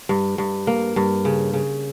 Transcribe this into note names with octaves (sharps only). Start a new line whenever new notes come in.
G2
G2
A#3
G2
C#3
C#3